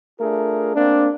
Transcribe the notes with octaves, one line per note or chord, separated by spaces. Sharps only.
A3 D4 F4 G#4 A#4
A#3 C4 D4